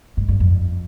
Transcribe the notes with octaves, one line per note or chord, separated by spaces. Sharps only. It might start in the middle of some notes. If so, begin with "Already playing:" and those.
G#2
G2
F2